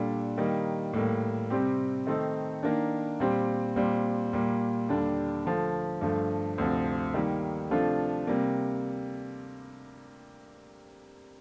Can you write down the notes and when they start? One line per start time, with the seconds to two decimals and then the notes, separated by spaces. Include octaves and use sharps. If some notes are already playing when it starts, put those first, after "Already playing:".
Already playing: A#2 G3 D4 A4
0.37 D#3 G3 A#3 D#4
0.93 A2 G3 A#3
1.50 C3 G3 C4 G4
2.07 D#3 A3 C4 D#4 A4
2.63 D#3 A#3 D4
3.20 A#2 G3 C4 G4
3.76 A#2 G3 C4
4.33 A#2 G3 A#3
4.89 D#2 D3 G3 D4
5.45 D3 F3 A3
6.01 G2 D3 F3 A3
6.58 D2 C3 F3
7.14 D#3 G3 A#3
7.70 C3 F3 A3 D4 F4
8.27 C3 G3 A#3